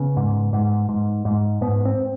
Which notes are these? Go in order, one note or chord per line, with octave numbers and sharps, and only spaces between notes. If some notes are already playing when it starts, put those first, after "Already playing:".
Already playing: C#3 B3
G#2
G#2
G#2
G#2
G#2 B3
C4